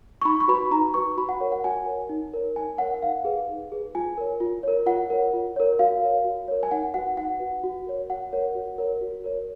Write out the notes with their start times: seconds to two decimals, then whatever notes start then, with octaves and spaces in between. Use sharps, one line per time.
0.22 C#6
0.25 D#4 B5
0.40 C#6
0.48 F#4 B4 B5
0.71 D#4 A#5
0.94 F#4 B4 C#6
1.17 F#4 B5
1.29 F#5
1.40 A#4 C#5
1.52 F#5
1.64 F#4 G#5
1.86 A#4 C#5
2.09 D#4
2.34 A#4 C#5
2.56 D#4 G#5
2.78 A#4 C#5 F#5
2.94 F#5
3.02 D#4 F5
3.25 G#4 B4
3.49 D#4
3.72 G#4 B4
3.95 F4 G#5
4.18 A#4 C#5
4.40 F4
4.63 A#4 C#5
4.86 F4 F#5
5.10 A#4 C#5
5.33 F4
5.56 A#4 C#5
5.79 F#4 F5
6.02 A#4 C#5
6.24 F#4
6.48 A#4 C#5
6.63 G#5
6.71 D#4 F#5
6.94 F#4 B4 F#5
7.17 D#4 F#5
7.39 F#4 B4
7.64 F#4
7.86 A#4 C#5
8.09 F#4 F#5
8.33 A#4 C#5
8.55 F#4
8.78 A#4 C#5
9.01 F#4
9.24 A#4 C#5